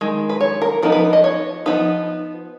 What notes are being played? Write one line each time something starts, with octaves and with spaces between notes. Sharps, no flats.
D#3 G#3
B4
C#5
A#4
F3 B3 D#4 A#4
B4
D#5
C#5
F3 B3 D#4 B4